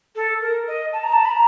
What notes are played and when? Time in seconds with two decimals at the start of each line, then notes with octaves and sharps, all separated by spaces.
0.15 A4
0.41 A#4
0.67 D#5
0.93 A5
1.04 A#5
1.13 A5
1.25 B5
1.31 A#5